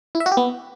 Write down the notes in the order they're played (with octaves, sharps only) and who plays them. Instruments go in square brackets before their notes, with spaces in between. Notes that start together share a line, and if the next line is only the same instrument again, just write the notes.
[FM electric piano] E4
E5
F#4
G4
B3